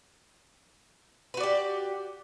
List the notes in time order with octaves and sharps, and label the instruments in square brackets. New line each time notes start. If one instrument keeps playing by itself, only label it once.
[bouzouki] B4
F#4
D5
G4